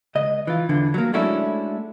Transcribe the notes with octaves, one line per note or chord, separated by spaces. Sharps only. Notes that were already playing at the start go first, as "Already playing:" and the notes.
C#2 D#5
E3 F4
E2 D3 E3
F#3 A#3
G#3 A3 C#4 D4 E4 F#4